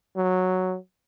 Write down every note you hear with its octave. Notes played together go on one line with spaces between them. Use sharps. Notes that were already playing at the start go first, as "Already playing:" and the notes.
F#3